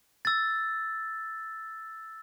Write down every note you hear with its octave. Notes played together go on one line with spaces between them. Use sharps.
E6 A6